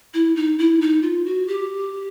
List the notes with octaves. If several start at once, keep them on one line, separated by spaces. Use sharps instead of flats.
E4
D#4
E4
D#4
F4
F#4
G4